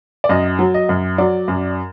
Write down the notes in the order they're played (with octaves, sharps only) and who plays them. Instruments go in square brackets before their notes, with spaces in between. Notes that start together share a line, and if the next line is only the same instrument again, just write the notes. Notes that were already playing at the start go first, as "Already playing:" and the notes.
[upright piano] D5
F#2 D#5
F#3
D#5
F#2
F#3 D5
F#2